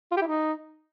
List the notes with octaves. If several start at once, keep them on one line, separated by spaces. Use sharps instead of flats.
F4
G4
E4
D#4